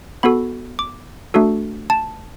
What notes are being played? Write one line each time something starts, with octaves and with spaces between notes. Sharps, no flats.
B3 F#4 A4 B5
D6
A3 D4 F#4 A4
A5